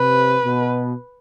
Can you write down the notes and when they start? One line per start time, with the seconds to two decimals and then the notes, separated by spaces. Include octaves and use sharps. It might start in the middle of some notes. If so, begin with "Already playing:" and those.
Already playing: C3 B4
0.43 B2